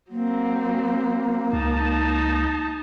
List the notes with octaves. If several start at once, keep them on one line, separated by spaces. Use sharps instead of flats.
F#3 A#3 C4
C#2 D#4 A5